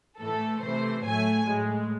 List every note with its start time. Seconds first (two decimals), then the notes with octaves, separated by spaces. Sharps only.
0.20 A2 E3 A3 A4
0.63 C3 E3 A3 C5
1.05 A2 F#3 A3 G#5
1.47 A2 G#3